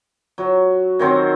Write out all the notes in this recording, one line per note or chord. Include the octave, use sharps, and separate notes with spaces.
F#3
D#3 F#3 C4